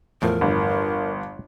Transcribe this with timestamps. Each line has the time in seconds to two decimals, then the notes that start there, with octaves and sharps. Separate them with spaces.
0.22 E2 A2 F3 A#4
0.41 G1